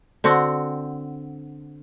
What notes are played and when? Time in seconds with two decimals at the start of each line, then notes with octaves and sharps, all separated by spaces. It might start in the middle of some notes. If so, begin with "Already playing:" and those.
0.24 D3 C4 F#4